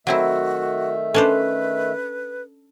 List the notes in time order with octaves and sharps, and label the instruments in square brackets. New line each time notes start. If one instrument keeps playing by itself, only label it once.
[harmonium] D#3 A3 E5 [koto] F#3 C4 E4 [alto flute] F#4
[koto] C#4 D4 C5 [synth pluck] A4 [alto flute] B4